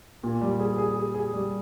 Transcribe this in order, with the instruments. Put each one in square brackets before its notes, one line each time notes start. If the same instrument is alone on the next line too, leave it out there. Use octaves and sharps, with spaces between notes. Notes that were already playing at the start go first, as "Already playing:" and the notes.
[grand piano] A#2
G3
G#4
G#4
G#4
G#4
G3